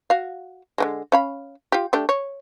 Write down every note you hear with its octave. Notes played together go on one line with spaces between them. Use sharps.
F#4 F5
D3 F3 G#3
C#4 F5 B5
F4 G4
A3 D4 G4
C#5